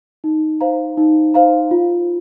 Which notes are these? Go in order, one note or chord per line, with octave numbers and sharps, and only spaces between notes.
D#4
C5 F5 A#5
D#4
C5 F5 A#5
F4